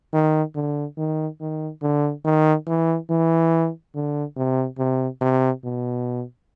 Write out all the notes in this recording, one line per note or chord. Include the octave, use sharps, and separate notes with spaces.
D#3
D3
D#3
D#3
D3
D#3
E3
E3
D3
C3
C3
C3
B2